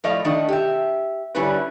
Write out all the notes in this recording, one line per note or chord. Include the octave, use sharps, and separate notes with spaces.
A2 F3 A3 D5 D#5 F5
D#3 A3 D4 D#5
G4 E5
D3 G3 C#4 D4 E4 B4